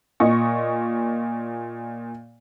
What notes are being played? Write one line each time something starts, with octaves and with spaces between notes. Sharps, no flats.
A#2 D#5 C#6